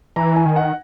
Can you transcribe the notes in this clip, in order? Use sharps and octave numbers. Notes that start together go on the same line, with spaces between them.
E3 A#5
G#5
D#3
F#5